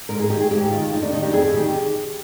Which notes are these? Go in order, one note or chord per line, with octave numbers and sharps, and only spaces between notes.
G#2 A#4
G#4
D#3 G4
G#4
G#2 G4
D#3 F4
F2 D#4
D4
D#3 D#4
G4
F2 G#4
D#3 G4